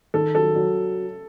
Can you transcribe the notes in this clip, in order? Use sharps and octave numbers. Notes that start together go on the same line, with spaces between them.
D#3 A4
F#3 A4
F#3